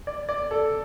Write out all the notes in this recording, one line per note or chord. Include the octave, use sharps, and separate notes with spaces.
D5
D5
A4